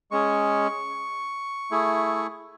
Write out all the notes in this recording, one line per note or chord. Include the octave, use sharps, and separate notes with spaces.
G#3 C#4 G#4 C#6
A3 E4 G#4